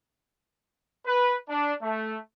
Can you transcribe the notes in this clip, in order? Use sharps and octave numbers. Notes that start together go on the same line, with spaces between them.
B4
D4
A3